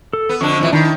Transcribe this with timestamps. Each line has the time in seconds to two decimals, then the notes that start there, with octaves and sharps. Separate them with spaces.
0.13 A4
0.29 B3
0.41 F2 D3 D4 C#6
0.59 F2 A#2 E3
0.73 D#3 D4 E4